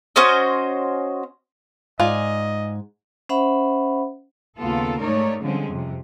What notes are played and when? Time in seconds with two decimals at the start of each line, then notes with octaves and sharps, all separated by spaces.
0.16 C#4 F#4 C5 D#5
2.00 G#2 F4 D5 D#5 G#5
3.29 C#4 C5 E5 F#5 B5
4.57 D#2 C#3 A#3 B3 F4 A4
5.01 G#2 A3 D#4 A#4 C#5 D5
5.42 D3 F3 G3 G#3 C4 C#4
5.71 F2 C3